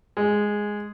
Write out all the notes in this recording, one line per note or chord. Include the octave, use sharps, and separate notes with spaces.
G#3